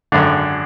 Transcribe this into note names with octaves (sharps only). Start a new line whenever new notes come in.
G#1 F#2 D3